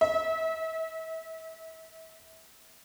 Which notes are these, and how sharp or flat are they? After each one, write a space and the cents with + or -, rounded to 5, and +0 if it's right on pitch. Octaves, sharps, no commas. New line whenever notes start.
E5 -30